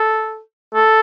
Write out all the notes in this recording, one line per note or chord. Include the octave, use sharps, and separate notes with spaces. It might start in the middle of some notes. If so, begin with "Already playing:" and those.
Already playing: A4
A4